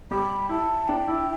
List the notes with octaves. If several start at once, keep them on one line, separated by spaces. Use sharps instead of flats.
G3 G4 B5
E4 A5
D4 G5
E4